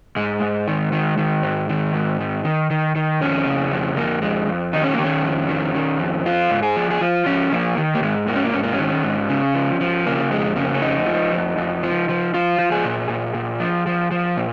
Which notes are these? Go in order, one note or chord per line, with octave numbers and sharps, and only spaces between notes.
G#2 G#3
G#2
D#3
D#3
D#3
G#2
D#3
G#2
D#3
D#3
D#3
D#3
F2 C#4
C#3
F2
F2 A#3
F2 G#3
F2
D#3 D#4
C#4
A#3
D#3 C#4
F2
D#3
D#3
F2
F3 F4
G#2
G#4
F3
G#4
F3 F4
F3 C#4
F3 A#3
D#3
A#3
G#2 G#3
G#2 A#3
C#4
A#3
G#2 C#4
A#3
C#4
D#3
G#2
C#3
F3
F3
C#3 A#3
F2 G#3
C#3 A#3
C#4
F2 D#4
F3
F2
F2
F3
F3
F3 F4
F3
G#4
A#2
A#2
A#2
F3
F3
F3
A#2